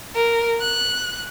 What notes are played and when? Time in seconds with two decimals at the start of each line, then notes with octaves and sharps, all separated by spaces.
0.15 A#4
0.60 F#6